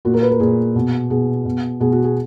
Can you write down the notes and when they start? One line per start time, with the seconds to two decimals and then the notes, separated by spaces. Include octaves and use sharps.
0.05 A#2 F#4
0.14 A#4
0.22 B4
0.31 A#4
0.40 A#2 G#4
0.75 B2
1.10 B2 G#4
1.45 B2
1.80 B2 G#4
1.92 F#4
2.04 G#4